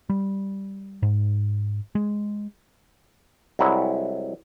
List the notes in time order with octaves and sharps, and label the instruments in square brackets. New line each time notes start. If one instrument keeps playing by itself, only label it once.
[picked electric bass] G3
G#2
G#3
[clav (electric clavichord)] C2 F#3 G#3 E4 C#5 F#5